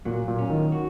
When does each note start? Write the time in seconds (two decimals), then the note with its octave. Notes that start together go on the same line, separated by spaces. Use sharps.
0.05 A#2 F#3
0.28 A#2
0.39 C#4
0.50 D#3
0.72 F#4